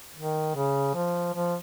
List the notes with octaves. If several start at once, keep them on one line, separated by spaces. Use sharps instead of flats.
D#3
C#3
F3
F3